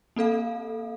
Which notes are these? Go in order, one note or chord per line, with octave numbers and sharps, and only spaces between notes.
A#3 C4 A4 F5